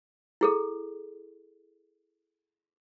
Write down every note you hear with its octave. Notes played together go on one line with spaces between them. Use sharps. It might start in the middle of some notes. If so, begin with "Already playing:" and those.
E4 G#4 A4